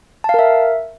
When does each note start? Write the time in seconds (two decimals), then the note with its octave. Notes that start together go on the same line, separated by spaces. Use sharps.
0.24 A5
0.29 F5
0.34 A#4
0.39 E5